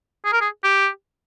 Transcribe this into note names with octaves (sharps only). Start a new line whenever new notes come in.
G#4
A#4
G#4
G4